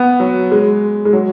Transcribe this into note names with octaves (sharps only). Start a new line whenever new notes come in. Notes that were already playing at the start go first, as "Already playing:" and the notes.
Already playing: B3
F#3
G#3
G#3
F#3